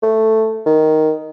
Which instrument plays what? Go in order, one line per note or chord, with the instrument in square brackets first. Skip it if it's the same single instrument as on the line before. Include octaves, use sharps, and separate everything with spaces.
[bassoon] A3
D#3